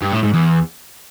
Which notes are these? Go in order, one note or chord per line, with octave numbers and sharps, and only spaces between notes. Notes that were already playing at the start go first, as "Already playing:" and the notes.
G2
A2
G#2
E2